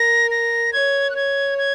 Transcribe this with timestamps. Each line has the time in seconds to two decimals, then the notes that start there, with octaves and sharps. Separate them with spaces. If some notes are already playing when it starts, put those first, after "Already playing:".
Already playing: A#4 A#6
0.31 A#6
0.73 C#5 G#6
1.10 F#6
1.16 C#5 G#6
1.58 G#6